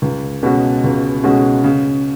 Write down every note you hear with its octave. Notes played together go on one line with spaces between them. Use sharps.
C#2
B2 G#3 C#4 F#4
C#2
B2 G#3 C#4 F#4
C#3